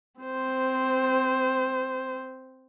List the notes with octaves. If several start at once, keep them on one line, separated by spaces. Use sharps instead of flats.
C4 C5